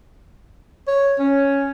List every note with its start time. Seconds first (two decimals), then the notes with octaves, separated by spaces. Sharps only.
0.87 C#5
1.19 C#4